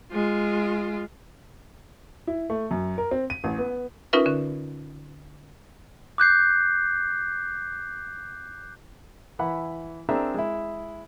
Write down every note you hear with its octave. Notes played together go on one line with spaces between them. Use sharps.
G#3 F4
E4
A3
F#2
A#4
C4
D#7
A1
B3
C#4 D#4 F4 A#4 B4 E5
D3 C#4
D6 F#6 G6 C7
E3 E4 F#5 B5
C4 D4 G#4 A#4 E5 A#5
G#3 E4